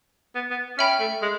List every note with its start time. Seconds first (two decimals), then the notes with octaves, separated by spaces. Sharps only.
0.35 B3
0.50 B3
0.78 C#4 E5 G5 B5
1.00 A3
1.22 G#3